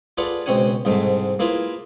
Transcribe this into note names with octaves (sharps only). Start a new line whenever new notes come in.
F4 G#4 A4 B4 D5 F#5
C#2 B2 C4 C#4 F#5 G#5
C2 G#2 C3 G#3 A3
A#3 E4 F4 G#4 B4